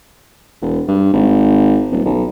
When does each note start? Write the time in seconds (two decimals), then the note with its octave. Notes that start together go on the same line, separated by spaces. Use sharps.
0.62 E1
0.88 G2
1.13 G#1
1.91 D#1
2.05 B1